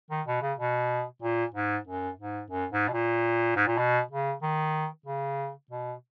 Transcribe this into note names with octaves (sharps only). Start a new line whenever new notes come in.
D#3
B2
C#3
B2
A#2
G#2
F#2
G#2
F#2
G#2
B2
A#2
G#2
A#2
B2
C#3
D#3
C#3
B2